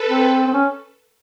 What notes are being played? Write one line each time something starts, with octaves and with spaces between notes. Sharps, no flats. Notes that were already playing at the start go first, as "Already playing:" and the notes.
Already playing: A4 B4
C4
C4
C#4